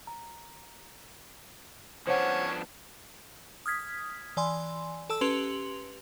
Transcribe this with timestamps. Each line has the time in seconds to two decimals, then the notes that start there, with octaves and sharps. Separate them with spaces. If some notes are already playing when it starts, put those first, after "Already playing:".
0.07 A#5
2.07 F3 B3 C#4 D4 C5 C#5 F#5
3.66 D#6 F6 G#6 B6
4.37 E3 D5 G#5 C6
5.10 A4 A5 E6
5.21 C#4 G4 B4 C6 F7 F#7